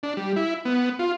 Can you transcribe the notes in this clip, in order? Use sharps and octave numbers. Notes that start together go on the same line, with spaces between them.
D4
G3
E4
B3
F4